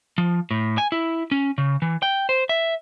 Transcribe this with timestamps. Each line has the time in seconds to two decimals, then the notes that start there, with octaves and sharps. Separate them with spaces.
0.18 F3
0.51 A2
0.78 G#5
0.92 E4
1.31 C#4
1.58 C#3
1.82 E3
2.02 G5
2.29 C5
2.49 E5